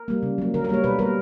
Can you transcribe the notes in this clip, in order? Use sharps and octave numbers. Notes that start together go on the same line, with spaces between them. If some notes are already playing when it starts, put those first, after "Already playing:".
Already playing: A#4
G3 A#3
C#3
F#3 A#3
D3 A#4
A#4
G3 A#3 C#5
B2 B4
G3 A#3 A#4